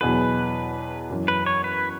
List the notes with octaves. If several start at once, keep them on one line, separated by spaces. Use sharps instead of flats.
E2 B2 F#3 B3 G#4 B4
F#2 E3 C#4
B4
C#5
B4